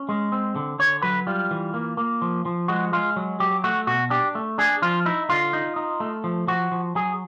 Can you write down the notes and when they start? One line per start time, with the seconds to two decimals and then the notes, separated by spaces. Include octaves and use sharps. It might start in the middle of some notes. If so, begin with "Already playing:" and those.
Already playing: C#4
0.09 G#3
0.32 C4
0.56 D3
0.79 D3 C#5
1.02 F#3 B4
1.27 G3 F4
1.51 E3
1.74 A#3
1.97 A#3
2.22 F3
2.45 F3
2.68 G#3 F#4
2.93 G#3 F4
3.16 F#3
3.40 F#3 G4
3.64 A3 F#4
3.87 B2 F#4
4.10 D4 G4
4.35 A3
4.58 D4 G#4
4.82 F3 F4
5.06 D#4 E4
5.29 D3 F4
5.53 D#4
5.76 D#4
6.00 A3
6.24 F3
6.48 F3 F#4
6.72 F3
6.95 F#3 G#4